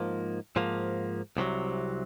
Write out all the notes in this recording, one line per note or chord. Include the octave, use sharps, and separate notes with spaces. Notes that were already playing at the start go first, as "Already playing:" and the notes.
Already playing: G#2 F3 A#3
G#2 F3 A#3
C2 C3 D#3 F#3